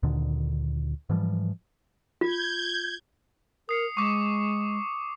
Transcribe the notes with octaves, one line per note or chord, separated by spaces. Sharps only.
D2 A#2 D3 D#3
G#2 E3 F3 G3
F4 G6 G#6
A#4 D#6 C7 C#7
G#3 C#6 D6 C7